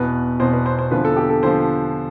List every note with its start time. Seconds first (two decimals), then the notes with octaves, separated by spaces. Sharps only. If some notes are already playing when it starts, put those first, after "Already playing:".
Already playing: E2 B2 B4
0.40 E2 B2 C5
0.53 B4
0.66 C5
0.79 C5
0.91 E2 D3 F3 B4
1.05 A4
1.17 G4
1.30 A4
1.43 D3 F3 C5